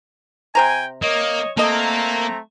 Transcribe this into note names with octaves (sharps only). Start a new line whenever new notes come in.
C3 C5 G5 G#5 A#5
A#3 C#5 D#5
A3 A#3 C4 A4 D#5 A#5